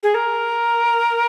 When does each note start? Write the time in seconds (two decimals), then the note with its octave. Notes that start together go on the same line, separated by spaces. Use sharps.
0.03 G#4
0.14 A#4